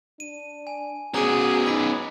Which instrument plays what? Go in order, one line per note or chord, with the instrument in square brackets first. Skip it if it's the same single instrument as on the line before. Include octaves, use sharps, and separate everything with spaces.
[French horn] D4 [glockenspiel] D#7
[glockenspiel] G#5
[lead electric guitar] B3 C#4 [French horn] F#4 [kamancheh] G#4 [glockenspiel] A#5 D6 D7
[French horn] D#4 [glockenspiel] B5 D6 B6